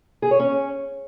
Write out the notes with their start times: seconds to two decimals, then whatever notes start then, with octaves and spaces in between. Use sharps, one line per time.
0.22 G#4
0.31 C#5
0.40 C#4